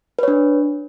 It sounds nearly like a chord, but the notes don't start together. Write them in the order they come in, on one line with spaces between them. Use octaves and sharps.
B4 C#5 D4